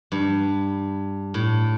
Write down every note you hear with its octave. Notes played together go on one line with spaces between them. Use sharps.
G2
A2